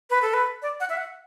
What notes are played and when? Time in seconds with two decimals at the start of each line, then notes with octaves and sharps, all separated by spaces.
0.10 B4
0.22 A4
0.34 B4
0.62 D5
0.80 F#5
0.90 E5
0.97 F#5